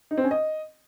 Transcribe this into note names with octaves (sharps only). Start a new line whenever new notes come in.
D#4
C4
C#4
D#5